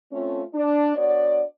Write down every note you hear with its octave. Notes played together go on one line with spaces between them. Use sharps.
A3 C4 C#4 F4
D4
B3 D4 F#4 C#5 D5